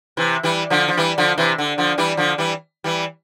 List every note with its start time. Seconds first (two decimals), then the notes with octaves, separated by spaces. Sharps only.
0.17 C3 E3
0.43 E3 G3
0.70 D3 F3
0.88 F3
0.97 E3 G3
1.18 D3 F3
1.38 C3 E3
1.58 D3
1.78 D3 F3
1.98 E3 G3
2.17 D3 F3
2.38 E3 G3
2.84 E3 G3